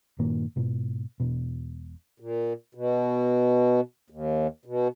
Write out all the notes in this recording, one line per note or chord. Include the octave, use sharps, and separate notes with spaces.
G2 A#2 D#3 A#3
G#2 B2
E1 B2
A#2
B2
D#2
B2